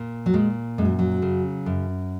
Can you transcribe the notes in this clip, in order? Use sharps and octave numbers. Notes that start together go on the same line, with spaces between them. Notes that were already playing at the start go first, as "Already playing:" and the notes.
Already playing: A#2
F#3
A#2 G#3
F#2 G#3
F#3
F#3
C#3
F#2